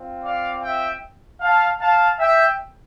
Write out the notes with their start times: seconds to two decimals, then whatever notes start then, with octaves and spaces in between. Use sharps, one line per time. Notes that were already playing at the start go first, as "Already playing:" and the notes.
Already playing: C4 F4
0.23 D5 F5
0.63 E5 G5
1.41 F5 A5
1.80 F5 A5
2.19 E5 G5